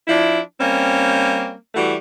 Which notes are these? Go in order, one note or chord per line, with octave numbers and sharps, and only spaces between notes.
F3 D4 E4
G3 A#3 C4 C#4
E3 G3 A3 F#4